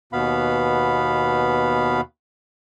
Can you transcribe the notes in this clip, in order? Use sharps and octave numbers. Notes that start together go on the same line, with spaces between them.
D#2 B2 B3 F5 B5